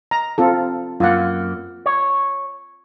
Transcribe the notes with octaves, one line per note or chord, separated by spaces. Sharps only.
A#5
C4 F4 A4
F#2 A#3 F4 F#5
C#5